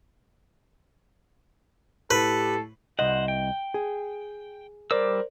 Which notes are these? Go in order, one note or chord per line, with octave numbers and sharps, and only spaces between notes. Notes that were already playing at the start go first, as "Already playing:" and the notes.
A2 G4 A4 B4
C2 C5 D#5 F#5
G5
G#4
G3 A#4 C5 D5 D6 E6